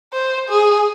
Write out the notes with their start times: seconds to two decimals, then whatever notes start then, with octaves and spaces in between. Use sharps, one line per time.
0.13 C5
0.49 G#4